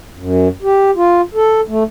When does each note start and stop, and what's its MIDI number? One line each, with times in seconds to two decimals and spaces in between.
0.16 0.48 42
0.63 0.91 67
0.96 1.21 65
1.34 1.61 69
1.68 1.83 57